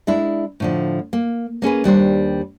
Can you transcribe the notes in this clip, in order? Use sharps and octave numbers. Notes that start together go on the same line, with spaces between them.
G#3 D4 E4
A2 D3 F3
A#3
A#3 C#4 G#4 B4
D#2 G3 D4 C5